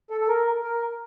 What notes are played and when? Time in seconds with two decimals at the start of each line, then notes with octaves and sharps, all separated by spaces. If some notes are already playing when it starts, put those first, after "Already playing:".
0.10 A4
0.21 A4
0.28 A#4
0.63 A#4